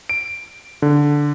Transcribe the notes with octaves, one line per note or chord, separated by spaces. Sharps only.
D7
D3